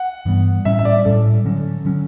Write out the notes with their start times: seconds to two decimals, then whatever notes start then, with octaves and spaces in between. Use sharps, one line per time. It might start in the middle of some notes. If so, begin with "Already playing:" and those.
Already playing: F#5
0.25 G2 E3 G3 B3
0.65 A2 G3 C#4 E5
0.79 E5
0.85 D5
1.05 A2 G3 C#4 A4
1.45 D3 F#3 C#4
1.85 D3 F#3 C#4